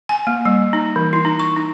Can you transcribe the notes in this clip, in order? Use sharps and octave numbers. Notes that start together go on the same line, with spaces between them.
G#5
A#3
G3
D#4
E3
E4
D#4
C#6
D#4